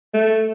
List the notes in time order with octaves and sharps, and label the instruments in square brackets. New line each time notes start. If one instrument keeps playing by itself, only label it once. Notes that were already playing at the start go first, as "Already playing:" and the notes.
[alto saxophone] A3